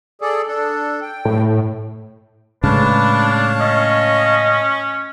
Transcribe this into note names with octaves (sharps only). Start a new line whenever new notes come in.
G#4 A4 D5
D4 A4
G5
A2
A2 C#3 G#3 D4 B4 C#5 F5 A5
C#4 D#5